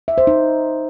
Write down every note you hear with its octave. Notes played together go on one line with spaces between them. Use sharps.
E5
C5
D#4